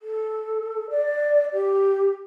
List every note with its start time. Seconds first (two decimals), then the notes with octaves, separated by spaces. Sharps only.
0.01 A4
0.91 D5
1.53 G4